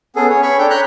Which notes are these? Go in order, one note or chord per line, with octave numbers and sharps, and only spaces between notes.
B3 C#4 G#4 A4
C#4 C#5
C#5 B5 C#6
D4 A4 G5
C#5 A#5 B5 F#6 G6